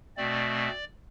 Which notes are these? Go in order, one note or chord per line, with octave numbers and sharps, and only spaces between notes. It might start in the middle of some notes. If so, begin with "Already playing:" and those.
B2 A3 C4 D5